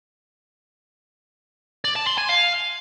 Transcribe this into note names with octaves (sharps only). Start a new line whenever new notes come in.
D5
A5
C6
G#5
F5